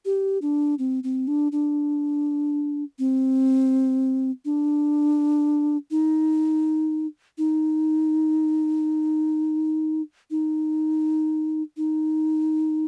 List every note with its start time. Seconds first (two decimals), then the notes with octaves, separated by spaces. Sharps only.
0.05 G4
0.42 D4
0.79 C4
1.04 C4
1.28 D4
1.52 D4
2.99 C4
4.45 D4
5.91 D#4
7.38 D#4
10.31 D#4
11.77 D#4